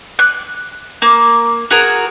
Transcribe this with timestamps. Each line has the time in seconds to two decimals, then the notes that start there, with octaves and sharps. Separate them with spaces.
0.19 F#6
1.02 A#3
1.71 F#4 G#4 A#4